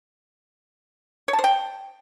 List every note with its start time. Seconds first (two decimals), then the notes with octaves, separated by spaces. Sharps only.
1.28 C#5
1.33 A5
1.39 C5
1.44 G5